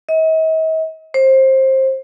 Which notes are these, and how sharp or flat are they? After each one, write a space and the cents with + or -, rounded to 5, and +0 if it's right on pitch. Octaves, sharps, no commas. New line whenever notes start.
D#5 +45
C5 +20